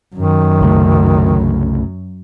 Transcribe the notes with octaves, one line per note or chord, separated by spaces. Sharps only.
F#2 D#3 F#3
C2 C#3 A3